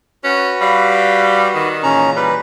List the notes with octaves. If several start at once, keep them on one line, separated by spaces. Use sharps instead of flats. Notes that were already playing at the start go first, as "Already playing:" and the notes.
C#4 F#4 B4
G3 F5 B5
D#3
A#2 C#3 E3 C#4 A#5
G3 B4